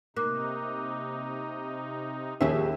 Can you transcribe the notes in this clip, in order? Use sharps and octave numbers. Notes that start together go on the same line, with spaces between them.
C3 A#3 D#4 D6 F#6
D#2 F3 G4 G#4 E5